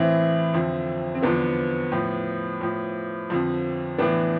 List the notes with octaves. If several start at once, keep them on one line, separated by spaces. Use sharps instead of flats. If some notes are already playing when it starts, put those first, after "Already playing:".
Already playing: A2 E3 C4 E4
F2 D3 F3
C4
E2 D3 F3 B3 D4
A2 F3
A2 F3
F2 D3 F3
A2 E3 B3 D4